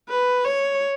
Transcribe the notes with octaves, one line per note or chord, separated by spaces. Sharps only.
B4
C#5